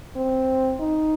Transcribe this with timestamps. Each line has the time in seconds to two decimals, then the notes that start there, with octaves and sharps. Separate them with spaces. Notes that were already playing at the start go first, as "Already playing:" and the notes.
0.16 C4
0.80 D#4